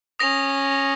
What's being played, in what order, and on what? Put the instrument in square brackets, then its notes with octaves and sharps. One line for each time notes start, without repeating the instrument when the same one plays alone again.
[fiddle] C#4 [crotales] D#6 A#6 F7